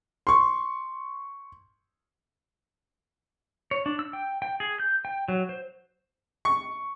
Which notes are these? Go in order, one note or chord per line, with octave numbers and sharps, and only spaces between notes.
C6 C#6
C#5
D4
E6
G5
G5
G#4
G6
G5
F#3
C5
C#6